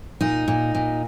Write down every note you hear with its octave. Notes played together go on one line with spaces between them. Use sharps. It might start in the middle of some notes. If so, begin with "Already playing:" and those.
A#2 D#4
A#2
A#2